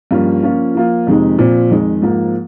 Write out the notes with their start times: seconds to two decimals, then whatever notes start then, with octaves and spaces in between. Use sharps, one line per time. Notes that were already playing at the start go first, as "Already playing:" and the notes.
0.11 G2 F3 A#3 C#4
0.43 F3 A#3 C#4 F4
0.75 F3 A#3 F4
1.07 F2 C3 D#3 G#3 D#4
1.38 A#2 F3 C4
1.70 F2 D#3 G#3
2.02 G#2 F3 A#3